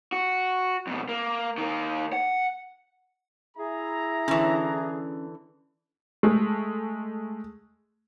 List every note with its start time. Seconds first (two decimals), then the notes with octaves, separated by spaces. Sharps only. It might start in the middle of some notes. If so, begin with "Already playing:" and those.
0.12 F#4
0.87 F2 B2
1.09 A#3
1.58 D#3 A#3
2.13 F#5
3.57 E4 G#4 A#5
4.28 D3 E3 C#4
6.23 G#3 A3